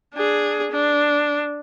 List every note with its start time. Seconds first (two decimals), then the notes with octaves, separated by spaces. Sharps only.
0.14 D4 G#4
0.71 D4